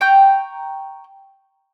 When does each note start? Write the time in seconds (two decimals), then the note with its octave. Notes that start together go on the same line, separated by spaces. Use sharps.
0.01 G5 A#5 C#6 G6